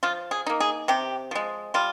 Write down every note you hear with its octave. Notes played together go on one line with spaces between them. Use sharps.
F3 F4
G#4
A#3 D#4
G#4
C3 G4
F3 G#3
G3 F4